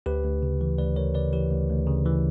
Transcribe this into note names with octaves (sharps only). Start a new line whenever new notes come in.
D2 G4 B4
D2
C#3
E3
D2 B4 D5
D2 A#4 C#5
C#3 B4 D5
E3 G4 B4
D2
D2
C#3
E3